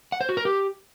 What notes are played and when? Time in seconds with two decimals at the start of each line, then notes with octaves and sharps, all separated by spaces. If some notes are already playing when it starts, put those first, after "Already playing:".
0.12 F#5
0.21 C5
0.29 F#4
0.37 A#4
0.45 G4